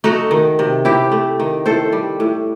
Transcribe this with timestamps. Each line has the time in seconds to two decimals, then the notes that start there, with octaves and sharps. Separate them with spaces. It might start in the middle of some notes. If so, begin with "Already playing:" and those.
0.04 A3 D#4 F#4
0.31 D#3
0.59 C3
0.85 C3 E4 G4
1.11 A3
1.40 D#3
1.66 A2 A4 C5
1.92 G3
2.20 A2